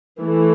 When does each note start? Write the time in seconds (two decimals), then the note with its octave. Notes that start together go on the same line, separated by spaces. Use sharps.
0.21 E3 A3